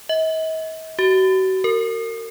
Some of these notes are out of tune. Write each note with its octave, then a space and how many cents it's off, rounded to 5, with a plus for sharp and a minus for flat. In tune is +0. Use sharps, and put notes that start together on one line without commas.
D#5 +45
F#4 +35
A#4 -35